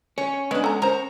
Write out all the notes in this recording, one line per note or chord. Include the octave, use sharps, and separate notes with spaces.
C#4 C#5
G#3 B3 D4
A4 A#5
A#4 C5 A#5